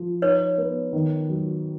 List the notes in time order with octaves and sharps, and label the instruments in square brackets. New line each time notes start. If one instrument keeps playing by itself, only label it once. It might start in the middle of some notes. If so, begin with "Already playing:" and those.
Already playing: [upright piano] F3
[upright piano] D#4 [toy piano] B4 C#5
[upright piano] B3
D#3
F#3